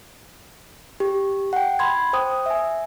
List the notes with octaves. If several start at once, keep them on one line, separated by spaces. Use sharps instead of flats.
G4
F#5 G5
B5 C6 G#6
C5 G5 D#6
E5 G#5